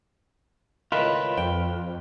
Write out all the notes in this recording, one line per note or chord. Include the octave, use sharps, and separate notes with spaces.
C#2 A2 D#3 F4 B4
F2 G5